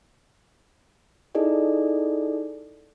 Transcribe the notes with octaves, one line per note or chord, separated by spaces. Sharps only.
D#4 E4 G#4 A4 D5 D#5